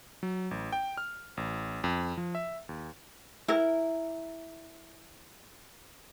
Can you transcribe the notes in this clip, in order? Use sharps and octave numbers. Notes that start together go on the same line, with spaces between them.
F#3
A1
G5
F6
A1
F2
F3
E5
D#2
E4 A#4